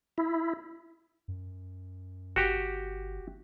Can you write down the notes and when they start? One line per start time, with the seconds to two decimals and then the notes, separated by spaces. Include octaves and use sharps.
0.18 E4
1.28 F#2
2.36 G1 F#4 G4